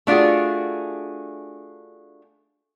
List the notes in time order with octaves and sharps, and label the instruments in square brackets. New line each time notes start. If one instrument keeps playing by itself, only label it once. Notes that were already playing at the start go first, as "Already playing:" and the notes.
[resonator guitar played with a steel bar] A3 D4 F4 F#4 G#4